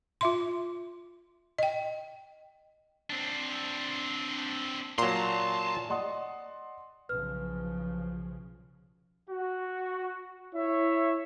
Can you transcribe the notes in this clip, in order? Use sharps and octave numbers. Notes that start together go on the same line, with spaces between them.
F4 E5 C6
D#5 G5
C4 D4
A#2 F#3 A5 A#5 C6
D5 D#5 F#5 C6 D#6
B1 C#3 F3 B4 F6
F#4
E4 C#5 E5